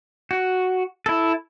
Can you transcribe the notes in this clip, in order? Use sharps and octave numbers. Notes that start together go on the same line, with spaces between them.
F#4
E4 A4